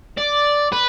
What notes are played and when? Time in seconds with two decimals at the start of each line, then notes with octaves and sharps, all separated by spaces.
0.17 D5
0.73 B4